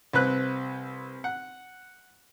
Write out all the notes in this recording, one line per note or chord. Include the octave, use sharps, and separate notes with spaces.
C2 C4 B4 F#6
F#5